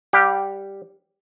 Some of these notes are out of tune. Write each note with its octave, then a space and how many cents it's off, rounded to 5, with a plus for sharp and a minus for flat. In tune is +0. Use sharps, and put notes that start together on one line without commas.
G3 +0 G4 +0 F#5 -35